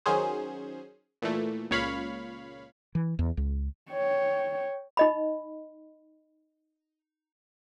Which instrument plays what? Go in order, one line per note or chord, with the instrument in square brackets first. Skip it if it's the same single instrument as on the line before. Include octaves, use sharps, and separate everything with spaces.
[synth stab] D#3 F#3 C#4 G#4 C5
A#2 E3 A3
C#2 A#2 C#5 F5 B5
[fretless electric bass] E3
E2
C#2
[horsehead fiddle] C#5 G5
[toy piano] D#4 D#5 B5